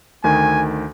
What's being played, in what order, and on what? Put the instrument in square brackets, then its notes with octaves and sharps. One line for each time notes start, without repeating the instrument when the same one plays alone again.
[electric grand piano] D2 D#3 [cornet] G#5